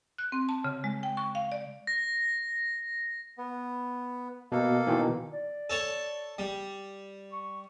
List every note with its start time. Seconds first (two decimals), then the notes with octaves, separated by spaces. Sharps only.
0.18 F#6
0.32 C4
0.49 A5
0.64 C#3
0.84 G#3
1.03 G5
1.17 C#6
1.35 F5
1.52 D5
1.87 A#6
3.38 B3
4.52 B2 A#3 A4
4.87 B2 D#3 E3
5.32 D5
5.70 A4 C#5 A5
6.38 G3
7.32 C#6